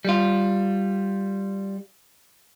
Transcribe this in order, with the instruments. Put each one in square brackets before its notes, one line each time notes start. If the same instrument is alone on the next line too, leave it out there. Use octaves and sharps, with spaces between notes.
[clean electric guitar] G3 F4